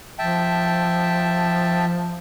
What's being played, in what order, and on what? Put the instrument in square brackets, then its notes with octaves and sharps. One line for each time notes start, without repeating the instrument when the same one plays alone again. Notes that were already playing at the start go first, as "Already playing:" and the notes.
[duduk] F3 [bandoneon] E5 G5 A5